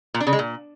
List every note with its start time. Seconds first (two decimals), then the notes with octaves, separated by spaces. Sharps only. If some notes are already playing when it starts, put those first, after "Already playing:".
0.14 A#2
0.21 D4
0.27 C#3
0.33 G#3
0.39 A#2